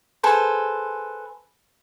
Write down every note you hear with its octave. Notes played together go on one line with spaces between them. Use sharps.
G#4 A4 B4 C5